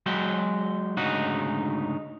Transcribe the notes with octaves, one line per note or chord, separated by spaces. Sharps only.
F#3 G#3 F#4 G5
D2 G#2 C#3 D#4 F#4